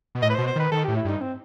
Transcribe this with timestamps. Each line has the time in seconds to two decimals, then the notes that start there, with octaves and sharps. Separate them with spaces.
0.15 B2
0.22 A2 D#5
0.30 B4
0.34 C5
0.38 B2
0.47 C5
0.56 D#3 B4
0.71 D#3 A4
0.84 G4
0.88 A2
0.97 E4
1.05 G2 D#4
1.21 C4